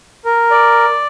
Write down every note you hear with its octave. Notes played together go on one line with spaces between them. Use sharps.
A#4
D5